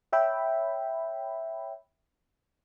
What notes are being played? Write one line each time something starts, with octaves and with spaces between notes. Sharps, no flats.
C#5 E5 G5 B5